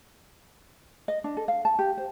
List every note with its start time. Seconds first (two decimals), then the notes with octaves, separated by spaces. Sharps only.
1.08 D#5
1.24 D4
1.37 A4
1.48 F5
1.65 A5
1.79 G4
1.98 C5